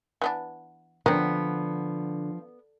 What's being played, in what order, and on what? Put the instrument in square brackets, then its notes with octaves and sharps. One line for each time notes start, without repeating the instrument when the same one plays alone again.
[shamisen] E3 B3 D4
[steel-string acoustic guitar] D3 [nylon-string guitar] F3 D4 [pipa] B3 [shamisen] C4 A#4